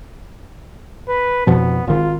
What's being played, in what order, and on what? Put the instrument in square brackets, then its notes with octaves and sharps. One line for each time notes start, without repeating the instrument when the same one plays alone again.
[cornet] B4
[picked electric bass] F2 B2 F3 [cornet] B3
[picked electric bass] G#1 D#3 [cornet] F4